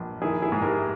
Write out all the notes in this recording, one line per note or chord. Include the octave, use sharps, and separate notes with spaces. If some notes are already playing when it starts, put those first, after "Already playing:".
Already playing: A#1
D#3 E4 G#4
E4 G#4
G#2
G4 A#4